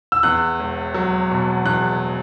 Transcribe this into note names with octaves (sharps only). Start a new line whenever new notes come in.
E6
E2 F#6
E1
F#3
B2
E2 F#6